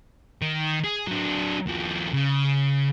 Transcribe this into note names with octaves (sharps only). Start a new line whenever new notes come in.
D#3
G#4
F#3 D4
D#2 F3
C#3